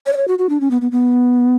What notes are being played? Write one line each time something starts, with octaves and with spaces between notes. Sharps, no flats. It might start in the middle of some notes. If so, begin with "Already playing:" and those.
C#5
D5
C#5
F#4
F#4
D4
C#4
B3
B3
B3